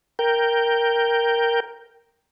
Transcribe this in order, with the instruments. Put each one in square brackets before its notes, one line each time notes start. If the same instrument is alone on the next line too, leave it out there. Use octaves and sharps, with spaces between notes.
[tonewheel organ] A#4 G5